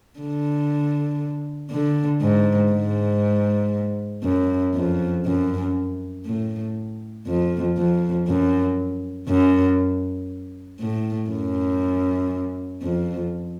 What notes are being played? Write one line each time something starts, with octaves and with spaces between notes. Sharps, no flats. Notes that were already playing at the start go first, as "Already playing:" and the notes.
D3
D3
G#2
G#2
F#2
F2
F#2
A2
F2
F2
F#2
F#2
A2
F#2
F2